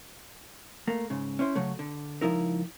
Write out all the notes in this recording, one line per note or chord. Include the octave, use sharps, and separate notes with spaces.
A3 A#3
G#2 C#3
C#4 E4 C5
C#3 F#3 A3
D3
C#2 C#3 F3 D#4 E4 A#4